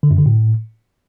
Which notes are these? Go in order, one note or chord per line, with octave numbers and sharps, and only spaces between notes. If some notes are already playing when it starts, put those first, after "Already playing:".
D3
F#2
D3
A2